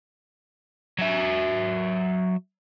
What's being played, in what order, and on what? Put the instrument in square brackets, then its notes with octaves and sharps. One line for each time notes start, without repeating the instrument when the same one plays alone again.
[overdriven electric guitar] F#3 E5